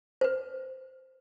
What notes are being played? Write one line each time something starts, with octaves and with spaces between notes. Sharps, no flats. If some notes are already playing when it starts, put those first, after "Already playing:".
B4 C5